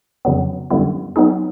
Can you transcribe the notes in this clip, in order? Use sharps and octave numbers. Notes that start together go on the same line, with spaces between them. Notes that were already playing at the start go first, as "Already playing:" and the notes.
F2 C#3 F#3 B3
F#2 D3 G3 B3 E4
F#3 B3 D#4 G#4